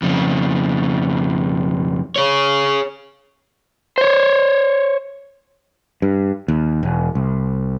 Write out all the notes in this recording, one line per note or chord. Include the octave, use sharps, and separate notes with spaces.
F2 C#3
G#4 C#5
C5 C#5
G2
D#2
E1
C2